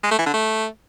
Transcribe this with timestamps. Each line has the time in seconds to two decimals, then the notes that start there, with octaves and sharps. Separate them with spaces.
0.03 G#3
0.11 A3
0.19 E3
0.26 D3
0.34 A3